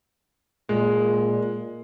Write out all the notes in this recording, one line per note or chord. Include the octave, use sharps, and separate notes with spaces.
A#2 G#3